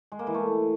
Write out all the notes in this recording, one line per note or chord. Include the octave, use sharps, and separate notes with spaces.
G#3
A#3
E3
A3